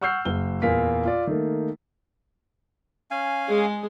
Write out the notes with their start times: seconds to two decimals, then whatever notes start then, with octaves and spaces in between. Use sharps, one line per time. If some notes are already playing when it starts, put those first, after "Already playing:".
0.01 F#5 C#6 E6 F6 G6 C7
0.25 F#1 G7
0.62 E2 A#2 A#3 F4 B6
1.05 F4 D5
1.27 D#3 A3 A#3
3.11 C#4 F5 G#5
3.48 G#3 G#4